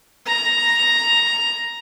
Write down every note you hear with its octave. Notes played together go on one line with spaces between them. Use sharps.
A#5